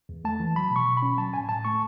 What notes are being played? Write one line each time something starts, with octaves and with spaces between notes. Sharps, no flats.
E2
A3 A5
E3
F#3 B5
B2
C#6
B2
B5
C#4
F#3 A5
A2 G#5
A2 A5
A3 C#6